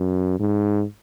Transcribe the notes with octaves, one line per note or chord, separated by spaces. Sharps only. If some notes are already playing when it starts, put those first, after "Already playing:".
Already playing: F#2
G#2